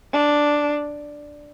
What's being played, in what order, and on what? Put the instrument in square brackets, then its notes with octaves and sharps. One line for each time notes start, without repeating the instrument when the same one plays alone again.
[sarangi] D4